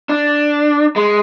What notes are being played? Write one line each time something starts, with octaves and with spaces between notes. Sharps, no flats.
D4
G#3